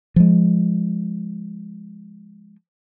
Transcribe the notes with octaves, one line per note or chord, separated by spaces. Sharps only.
F3 G#3